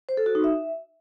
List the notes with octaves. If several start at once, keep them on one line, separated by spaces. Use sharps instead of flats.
C5
A4
F#4
D#4
E5